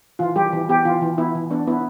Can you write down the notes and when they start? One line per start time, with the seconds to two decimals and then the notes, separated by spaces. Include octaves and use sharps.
0.19 E3 F4
0.36 G3 G4
0.53 E3
0.69 B3 G4
0.85 E3 F4
1.02 E3
1.18 B3 E4
1.35 E3
1.51 B3 D4
1.67 B3 E4